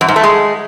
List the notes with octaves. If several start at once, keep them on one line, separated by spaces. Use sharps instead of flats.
F#2
G#2
A3
G#3